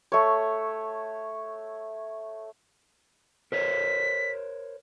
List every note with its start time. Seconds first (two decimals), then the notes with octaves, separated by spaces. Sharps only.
0.12 A3 C#5
3.52 A#4 C5 C#5 B6